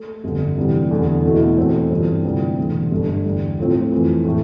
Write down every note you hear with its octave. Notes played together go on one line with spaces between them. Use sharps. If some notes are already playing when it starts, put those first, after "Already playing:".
Already playing: A3
G1 F2 D3
D2 C3 E3 G3
E2 D3 A3
E2 B2 A3 E4
E2 B2 A3 C4
G2 E3 A3 C4 F4
D2 C3 E3 G3 C4
E1 E2 D3
G1 G2 D3 A3 D4
E2 D3 G3
A2 F3 A3 C4 F4
F2 E3 A3
A2 E3 A3 E4